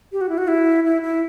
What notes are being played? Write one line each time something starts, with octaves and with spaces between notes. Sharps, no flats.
G4
F#4
E4
F#4
E4
E4
E4